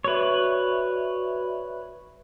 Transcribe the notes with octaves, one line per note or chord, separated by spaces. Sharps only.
F#4 B4 C#5 D5 E5